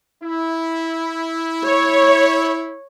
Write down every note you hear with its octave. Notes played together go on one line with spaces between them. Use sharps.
E4
C#5